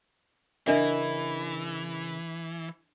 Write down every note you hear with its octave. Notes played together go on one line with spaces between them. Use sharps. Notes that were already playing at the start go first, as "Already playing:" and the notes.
C#3 E3 D4 A#4 D#5 E5